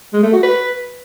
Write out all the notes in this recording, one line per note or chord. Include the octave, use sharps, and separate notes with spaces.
G#3
A3
F#4
B4